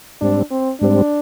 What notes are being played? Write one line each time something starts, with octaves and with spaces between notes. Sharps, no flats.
G#2 G3 C4 D4
C4
G#2 G3 C4 D4